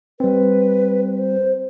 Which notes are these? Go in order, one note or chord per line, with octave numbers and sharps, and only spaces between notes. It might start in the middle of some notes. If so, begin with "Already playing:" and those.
G3 C4 B4
C5